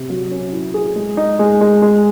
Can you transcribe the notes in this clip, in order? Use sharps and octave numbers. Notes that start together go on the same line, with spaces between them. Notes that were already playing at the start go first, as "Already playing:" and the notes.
Already playing: C3
F#3
C#4
E4
G#4
G#3
D#4
G#3
G#3
G#3